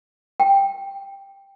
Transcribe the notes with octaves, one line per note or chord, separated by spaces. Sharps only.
G5